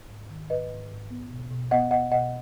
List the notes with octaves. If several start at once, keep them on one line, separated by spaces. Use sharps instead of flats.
G#2
D#3
G#2 B4 D#5
G#2
G#2
B3
B2
B2
B3 D#5 F#5
B3 D#5 F#5
B2 D#5 F#5